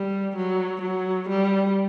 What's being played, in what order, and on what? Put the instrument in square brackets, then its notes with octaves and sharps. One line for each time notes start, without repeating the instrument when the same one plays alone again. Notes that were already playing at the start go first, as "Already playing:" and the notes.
Already playing: [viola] G3
F#3
F#3
G3